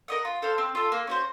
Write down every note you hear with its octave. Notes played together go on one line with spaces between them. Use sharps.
A#4 D#5 F#5
F4
A4 C5 F5
C4
F4 A4
A#3
C#4 F#4 C5